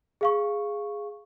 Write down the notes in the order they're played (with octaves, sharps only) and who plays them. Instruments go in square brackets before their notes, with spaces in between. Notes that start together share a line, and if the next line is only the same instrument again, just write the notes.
[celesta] G#4 F5 C#6